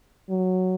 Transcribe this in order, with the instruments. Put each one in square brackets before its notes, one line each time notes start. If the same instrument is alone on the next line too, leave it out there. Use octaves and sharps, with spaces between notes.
[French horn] F#3